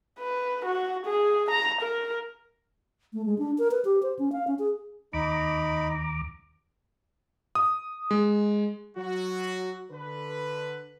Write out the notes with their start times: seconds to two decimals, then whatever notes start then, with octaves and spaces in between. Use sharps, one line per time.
0.19 B4
0.66 F#4
1.06 G#4
1.51 A#5
1.82 A#4
3.13 A3
3.26 G#3
3.38 D4
3.58 A#4
3.71 B4
3.85 G4
4.03 C5
4.19 C#4
4.32 F5
4.47 C#4
4.59 G#4
5.13 D#2 D#4 A#5 B5 D6
7.55 D#6
8.11 G#3
8.97 F#3 F#4
9.92 D3 B4